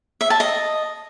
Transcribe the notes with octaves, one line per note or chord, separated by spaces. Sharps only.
E5
A5
D#5